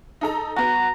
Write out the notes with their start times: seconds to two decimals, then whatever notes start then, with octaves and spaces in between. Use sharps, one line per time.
0.21 D#4 A4 A#5
0.56 B3 F#4 A#5